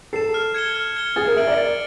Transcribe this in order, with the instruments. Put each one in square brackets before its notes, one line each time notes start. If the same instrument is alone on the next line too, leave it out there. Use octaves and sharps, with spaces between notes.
[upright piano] A4 [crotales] C7 E7
[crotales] F6
G#6 C#7 E7 G7
F6
G#6 C#7 E7 G7
[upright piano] G#4 [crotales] A6
[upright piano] A#4
[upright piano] E5 [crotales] D7 F#7
[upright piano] D5
[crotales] A6